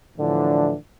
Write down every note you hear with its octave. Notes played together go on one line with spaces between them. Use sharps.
A2 D3 E3 F3 D4